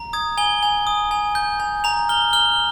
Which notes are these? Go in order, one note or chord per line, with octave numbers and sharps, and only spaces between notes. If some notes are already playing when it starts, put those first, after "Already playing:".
Already playing: A#5
D#6 G#6
G#5 G7
G#5
D#6
G#5
G6
G#5
A#5 F7
F6 G7
F6 G7